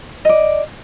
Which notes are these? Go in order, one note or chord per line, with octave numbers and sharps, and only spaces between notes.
D5 D#5